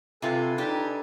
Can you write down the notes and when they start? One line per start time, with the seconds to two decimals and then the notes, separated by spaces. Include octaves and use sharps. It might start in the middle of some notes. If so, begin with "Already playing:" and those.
0.22 C3 F4 A4 B4 G#5
0.58 D4 D#4 G4